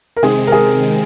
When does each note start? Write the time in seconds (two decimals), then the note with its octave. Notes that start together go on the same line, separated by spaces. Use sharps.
0.17 A#4
0.22 C3 D#3 G#3 C4 G#4
0.47 A#4
0.52 G#4